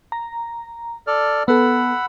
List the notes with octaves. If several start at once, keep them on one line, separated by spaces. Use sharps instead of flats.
A#5
A4 D5 F6
B3 A4 F#5 B5 E6